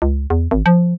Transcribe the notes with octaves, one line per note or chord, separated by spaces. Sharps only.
C#2
E2
G#1
F3